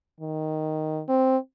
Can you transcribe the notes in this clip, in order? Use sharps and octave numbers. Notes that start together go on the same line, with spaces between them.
D#3
C4